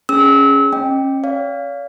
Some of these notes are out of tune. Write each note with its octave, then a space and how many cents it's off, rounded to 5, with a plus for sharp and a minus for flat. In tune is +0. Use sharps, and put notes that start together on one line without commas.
C#4 +0 G#4 +0 E6 -30
C#4 -30 D#5 +0 G5 +0
C#5 +45 F5 +0